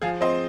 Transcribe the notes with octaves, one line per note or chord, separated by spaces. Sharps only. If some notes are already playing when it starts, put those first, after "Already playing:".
F3 F4 G#4
C4 C5 D#5